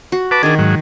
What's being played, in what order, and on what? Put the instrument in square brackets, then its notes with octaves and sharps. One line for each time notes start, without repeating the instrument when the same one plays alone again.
[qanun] F#4
[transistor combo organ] B4 A5 D6
[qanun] D#3 A#4 [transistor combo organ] D4 G#4
[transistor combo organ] G#2 F#3